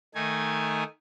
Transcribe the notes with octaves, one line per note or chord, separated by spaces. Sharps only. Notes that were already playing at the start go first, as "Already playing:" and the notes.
D#3 A3 D#4 G#5